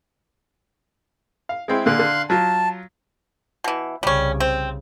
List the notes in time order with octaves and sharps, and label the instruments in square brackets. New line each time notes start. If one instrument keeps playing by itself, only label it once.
[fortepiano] F5
G#3 C4 E4
[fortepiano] A#2 D3 [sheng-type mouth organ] F5 C6 F#6
[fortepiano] D3
[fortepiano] F#3 F4 [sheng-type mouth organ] A5
[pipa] B2 E3
[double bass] C2 C#3 [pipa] G3 C#4
[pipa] C4